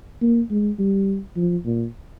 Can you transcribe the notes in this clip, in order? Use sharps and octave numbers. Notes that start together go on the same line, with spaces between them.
A#3
G#3
G3
F3
A#2